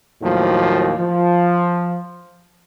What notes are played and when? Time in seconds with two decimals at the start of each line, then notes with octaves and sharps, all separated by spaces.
0.22 D#2 A2 F3 F#3 A#3
0.99 F3